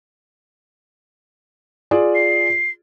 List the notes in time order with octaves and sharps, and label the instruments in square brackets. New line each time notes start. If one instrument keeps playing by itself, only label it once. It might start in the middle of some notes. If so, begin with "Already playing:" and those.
[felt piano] F4 G#4 D5
[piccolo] C7